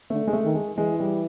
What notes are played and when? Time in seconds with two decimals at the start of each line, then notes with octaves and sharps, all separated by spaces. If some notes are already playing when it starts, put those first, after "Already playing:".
0.10 D3 A3
0.27 G#3
0.33 A3
0.44 D#3
0.55 G#3
0.77 E3 G#3
1.00 G3